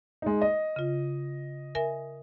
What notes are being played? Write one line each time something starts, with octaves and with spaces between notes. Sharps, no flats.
G#3 D#4
D#5
C#3 F4
A#4 E5 G#5